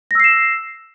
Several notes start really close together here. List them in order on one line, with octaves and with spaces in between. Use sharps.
A#6 E6 C7 E7